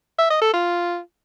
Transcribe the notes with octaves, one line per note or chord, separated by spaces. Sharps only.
E5
D#5
A4
F4